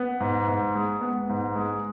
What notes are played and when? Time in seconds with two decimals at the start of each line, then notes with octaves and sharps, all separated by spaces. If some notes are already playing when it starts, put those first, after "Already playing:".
Already playing: B3
0.20 G#2
0.48 G#2
0.75 G#3
1.01 B3
1.29 G#2
1.56 G#3